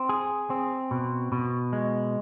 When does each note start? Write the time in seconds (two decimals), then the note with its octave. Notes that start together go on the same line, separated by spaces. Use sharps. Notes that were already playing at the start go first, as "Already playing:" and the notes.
Already playing: C4
0.09 G#4
0.50 C4
0.91 B2
1.32 B2
1.73 G#3